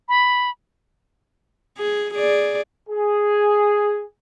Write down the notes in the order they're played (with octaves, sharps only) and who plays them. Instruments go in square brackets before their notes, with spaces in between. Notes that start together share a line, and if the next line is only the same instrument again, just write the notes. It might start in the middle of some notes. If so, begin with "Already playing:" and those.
[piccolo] B5
[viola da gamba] G#4
G#4 D5
[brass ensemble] G#4